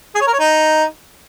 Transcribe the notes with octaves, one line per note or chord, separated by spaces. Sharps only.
G#4
C#5
A#4
C#5
D#4